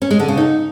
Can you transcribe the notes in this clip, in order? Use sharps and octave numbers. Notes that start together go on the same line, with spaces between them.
C#4
G#3
D3
C#3
D#4